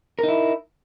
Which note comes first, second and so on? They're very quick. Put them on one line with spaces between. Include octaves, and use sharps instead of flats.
A#4 D#4 E4